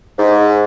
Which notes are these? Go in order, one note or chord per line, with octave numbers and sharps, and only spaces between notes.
G#2